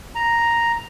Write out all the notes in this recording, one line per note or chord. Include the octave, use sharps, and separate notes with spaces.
A#5